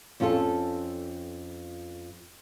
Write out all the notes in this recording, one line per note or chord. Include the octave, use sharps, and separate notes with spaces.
F2 C#4 F4 F#4 A4